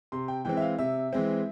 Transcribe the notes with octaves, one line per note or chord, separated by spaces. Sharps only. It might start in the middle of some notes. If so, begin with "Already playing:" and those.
C3 C6
G5
E3 G#3 C4 G5
E5
F5
C3 E5
E3 G#3 C4